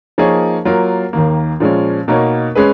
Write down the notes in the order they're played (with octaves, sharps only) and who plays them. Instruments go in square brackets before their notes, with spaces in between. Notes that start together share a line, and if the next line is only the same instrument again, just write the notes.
[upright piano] F3 A#3 D#4 G#4 C#5
F#3 A#3 F4 A#4
D#2 D#3 A#3
A#2 F3 G#3 C#4
B2 A#3 D#4 A#4 C#5
G#3 C#4 G#4 B4